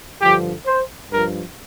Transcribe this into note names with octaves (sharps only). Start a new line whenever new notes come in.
G2 D3 F3 G4
C5
G2 F3 A#4